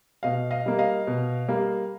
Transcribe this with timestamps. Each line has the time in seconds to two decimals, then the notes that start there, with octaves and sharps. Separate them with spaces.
0.23 B2 D#5 F5
0.51 D#5 F5
0.66 G3 A#3
0.78 D#5 F5
1.07 B2
1.48 G3 A#3